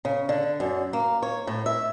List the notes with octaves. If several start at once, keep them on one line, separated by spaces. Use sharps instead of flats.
C#3
D3
F#2
A#3
C#5
A2
E5